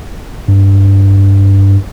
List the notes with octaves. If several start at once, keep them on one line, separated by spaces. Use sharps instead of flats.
G2